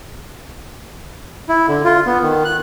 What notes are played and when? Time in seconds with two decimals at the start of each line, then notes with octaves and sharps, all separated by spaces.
1.49 E4
1.68 D3
1.85 F4
2.06 B3
2.22 D#3
2.45 F#6